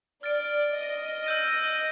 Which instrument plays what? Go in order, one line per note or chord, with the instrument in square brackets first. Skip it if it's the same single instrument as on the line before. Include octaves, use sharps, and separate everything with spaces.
[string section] D5 [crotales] F6 A6 D7
[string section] D#5
[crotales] E6 G6 A#6 D#7